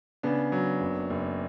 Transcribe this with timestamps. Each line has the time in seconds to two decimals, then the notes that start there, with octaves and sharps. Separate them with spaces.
0.23 C#3 B3 D4
0.52 F#3
0.81 F#1
1.10 F#1